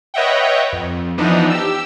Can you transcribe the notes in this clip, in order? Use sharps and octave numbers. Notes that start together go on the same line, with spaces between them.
B4 C#5 D#5 E5 F#5 G5
F2
E3 F3 B3 D4 D#4
G4 E6